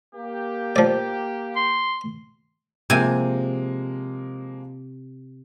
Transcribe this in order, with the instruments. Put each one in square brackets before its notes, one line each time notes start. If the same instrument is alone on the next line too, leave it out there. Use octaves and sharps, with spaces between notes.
[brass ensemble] A#3 G4
[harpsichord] F3 D5
[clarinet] C6
[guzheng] C3 G#5 [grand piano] F3 G#3 A#3